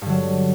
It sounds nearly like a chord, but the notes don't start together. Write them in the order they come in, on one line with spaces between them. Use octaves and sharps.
G2 D3 F#3